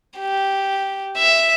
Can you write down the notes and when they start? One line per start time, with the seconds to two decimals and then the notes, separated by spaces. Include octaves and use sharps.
0.19 G4
1.18 E5